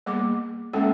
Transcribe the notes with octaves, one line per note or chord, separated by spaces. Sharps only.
G3 A#3 B3 G#4 D6
G#3 A#3 C#4 A4 E5 G5